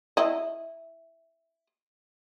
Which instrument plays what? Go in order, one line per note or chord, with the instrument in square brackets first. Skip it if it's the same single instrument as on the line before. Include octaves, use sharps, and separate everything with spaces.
[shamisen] E4 D#5